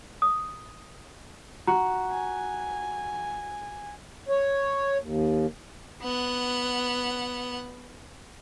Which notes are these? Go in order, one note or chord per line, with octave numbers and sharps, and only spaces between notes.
D#6
F#4 A#5
G#5
C#5
D#2
B3 F#5